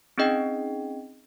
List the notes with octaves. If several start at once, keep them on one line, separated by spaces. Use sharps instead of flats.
C4 C#4 D#4 G#4 D#5 G5